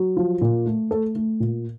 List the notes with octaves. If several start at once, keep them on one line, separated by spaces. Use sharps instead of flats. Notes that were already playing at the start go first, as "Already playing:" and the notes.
Already playing: F#3
F3
A#2
A3
A3 A4
A3
A#2